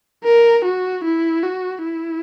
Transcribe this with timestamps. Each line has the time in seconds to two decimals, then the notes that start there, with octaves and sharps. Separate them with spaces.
0.24 A#4
0.64 F#4
1.04 E4
1.43 F#4
1.83 E4